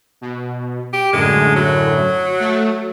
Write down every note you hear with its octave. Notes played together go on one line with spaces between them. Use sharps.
B2
G4
F#2 A2 D3 G#3
F#3
A3